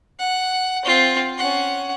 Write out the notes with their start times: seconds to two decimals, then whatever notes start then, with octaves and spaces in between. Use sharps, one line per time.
0.19 F#5
0.85 C4 F4
1.38 C#4 F#5